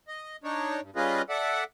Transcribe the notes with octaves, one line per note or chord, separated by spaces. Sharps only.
D#5
D4 D#4 C#5
G2
G3 C#4 F4 G#4 B4 D#5
A4 D5 E5 F#5